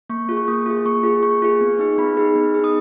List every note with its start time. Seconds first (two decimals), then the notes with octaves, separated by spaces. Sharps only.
0.10 A#3 C#6
0.29 F4 G#4
0.37 C#6
0.48 A#3 D#6
0.66 F4 G#4
0.85 A#3 C#6
1.03 F4 G#4
1.23 A#3 C#6
1.42 F4 G#4
1.61 B3
1.79 D#4 G#4
1.98 B3 B5
2.17 D#4 G#4
2.36 B3
2.54 G#4
2.59 D#4 D#6